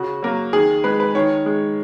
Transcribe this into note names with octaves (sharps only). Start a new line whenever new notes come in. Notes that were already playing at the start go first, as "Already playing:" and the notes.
Already playing: C#3 F#4
F#3 A#3
D#3 G#4
G#3 B4
B4
D#3 C#5
G#3